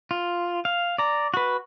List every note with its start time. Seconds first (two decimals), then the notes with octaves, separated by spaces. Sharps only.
0.11 F4
0.65 F5
0.98 D5 A#5
1.34 F#4 B4